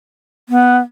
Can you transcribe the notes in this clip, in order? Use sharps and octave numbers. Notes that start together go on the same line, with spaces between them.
B3